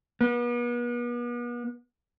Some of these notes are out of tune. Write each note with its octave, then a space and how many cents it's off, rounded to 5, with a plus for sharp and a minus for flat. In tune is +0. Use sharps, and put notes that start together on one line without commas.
B3 -40